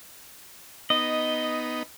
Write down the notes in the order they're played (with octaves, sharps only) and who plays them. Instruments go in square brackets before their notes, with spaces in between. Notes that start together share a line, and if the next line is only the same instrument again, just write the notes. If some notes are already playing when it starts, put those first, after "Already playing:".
[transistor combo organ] B3 D#4 [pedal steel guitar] D#5